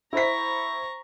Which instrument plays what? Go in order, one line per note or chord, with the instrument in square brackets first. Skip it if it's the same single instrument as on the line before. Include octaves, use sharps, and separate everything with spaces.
[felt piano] E4 C5 B6 [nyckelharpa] A#5 C#6